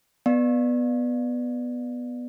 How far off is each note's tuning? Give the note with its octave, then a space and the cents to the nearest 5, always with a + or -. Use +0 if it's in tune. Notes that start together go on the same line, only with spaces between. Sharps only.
B3 +0 D5 +20 F5 +0